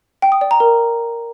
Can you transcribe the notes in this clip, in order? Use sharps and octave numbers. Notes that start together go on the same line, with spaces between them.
G5
D#6
D5
A#5
A#4